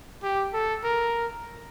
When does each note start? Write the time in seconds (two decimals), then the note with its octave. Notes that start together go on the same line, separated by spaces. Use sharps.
0.23 G4
0.53 A4
0.84 A#4